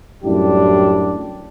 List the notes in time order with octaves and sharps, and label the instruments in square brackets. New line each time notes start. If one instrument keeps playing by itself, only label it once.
[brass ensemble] F#2 A2 G3 D4 E4 G4